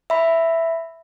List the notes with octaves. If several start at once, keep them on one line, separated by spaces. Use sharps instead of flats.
E5 B5